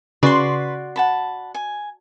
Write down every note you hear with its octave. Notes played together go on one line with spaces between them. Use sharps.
C#3 F#4 B4 D5 C6
F#5 A5 B5
G#5